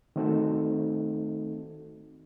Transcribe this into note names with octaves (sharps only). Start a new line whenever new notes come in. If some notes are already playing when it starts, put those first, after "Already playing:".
D#3 A3 C4 D#4 F#4 A4